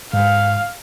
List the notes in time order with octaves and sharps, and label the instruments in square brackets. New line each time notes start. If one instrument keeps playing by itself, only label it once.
[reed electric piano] G#2 [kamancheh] F5